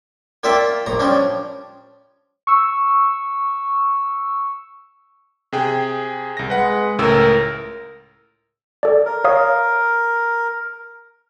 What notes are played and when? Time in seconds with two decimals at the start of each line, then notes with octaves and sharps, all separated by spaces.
0.43 A#3 F4 D5 E5 G5
0.86 A#1 A#2 A#5
0.99 F3 G3 C#4 D4
2.47 C#6 E6
5.52 C3 G#4 G5
6.37 C2 A#6
6.50 G#3 B4 F#5
6.99 C#2 A2 A#4 E6
8.83 A4 D5
9.05 A#4
9.24 C#5 F5 D#6